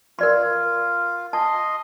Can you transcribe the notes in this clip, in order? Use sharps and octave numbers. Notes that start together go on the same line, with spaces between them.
F4 A#4 D5 C6
D#5 A5 C6